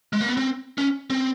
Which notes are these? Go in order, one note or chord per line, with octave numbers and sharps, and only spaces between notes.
G#3
A#3
B3
C4
C#4
C4